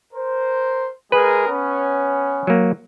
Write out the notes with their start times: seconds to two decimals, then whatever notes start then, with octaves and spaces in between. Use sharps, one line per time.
0.13 A#4 C5
1.12 G#3 G#4 A#4 B4
1.48 B3 C#4
2.47 F#3 A#3